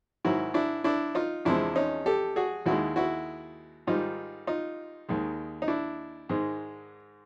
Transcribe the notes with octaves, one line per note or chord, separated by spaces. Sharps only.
G#2 D#3 F#3 E4 F#4
D4 E4
D4 E4
D#4 F4
E2 C3 F3 G#3 D4 E4
C#4 D#4
G4 A4
F#4 G#4
D#2 D#3 G#3 E4 F#4
E4 F#4
G#2 D#3 G3 D#4 F4
D#4 F4
D#2 D#3 G#3
D#4
D4 E4
G#2 D#3 G#3